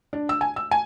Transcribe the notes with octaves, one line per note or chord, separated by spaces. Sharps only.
D4
E6
G#5
E6
G#5